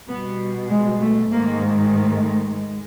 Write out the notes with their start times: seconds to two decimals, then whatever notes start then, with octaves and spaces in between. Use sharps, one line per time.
0.08 B2 G3 B3
0.70 G#3
1.01 A3
1.31 G#2 D#3 G#3 A#3
1.93 A3
2.55 G#3